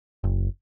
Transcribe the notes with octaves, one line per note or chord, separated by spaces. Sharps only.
F#1